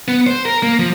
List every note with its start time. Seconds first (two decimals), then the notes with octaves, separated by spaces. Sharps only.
0.08 B3
0.27 C5
0.45 A#4
0.63 A#3
0.79 F3